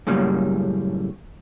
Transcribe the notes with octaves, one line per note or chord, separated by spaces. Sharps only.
F#2 A2 C#3 G3 A#3